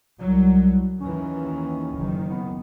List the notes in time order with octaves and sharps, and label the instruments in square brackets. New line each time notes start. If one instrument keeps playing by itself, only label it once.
[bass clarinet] C2 [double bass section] F#3
[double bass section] D#2 D#3 E3 [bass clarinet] C#4
[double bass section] F#1 D#3
[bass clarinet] B3